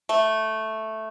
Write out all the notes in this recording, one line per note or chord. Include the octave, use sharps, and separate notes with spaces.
A3